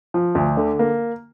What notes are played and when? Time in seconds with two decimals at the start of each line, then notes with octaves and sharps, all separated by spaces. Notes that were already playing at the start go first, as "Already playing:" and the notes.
0.14 F3
0.35 D2
0.57 D3
0.79 A#3